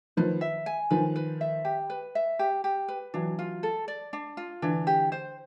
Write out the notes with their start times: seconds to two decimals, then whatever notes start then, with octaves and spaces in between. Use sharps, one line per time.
0.17 D#3 F3 B4
0.41 E5
0.66 G#5
0.90 D#3 F3 B4
1.16 B4
1.41 E5
1.65 G4
1.90 B4
2.15 E5
2.39 G4
2.64 G4
2.88 B4
3.14 E3 F#3 D4
3.39 F4
3.63 A4
3.88 D5
4.13 D4
4.37 F4
4.62 D3 E3 D4
4.87 G4
5.12 C5